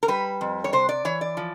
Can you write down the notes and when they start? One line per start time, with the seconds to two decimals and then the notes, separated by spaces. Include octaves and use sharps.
0.03 A#4
0.08 G3 B4
0.41 F2
0.64 C#5
0.73 C3 C5
0.89 D5
1.05 E3 C#5
1.21 D5
1.37 F3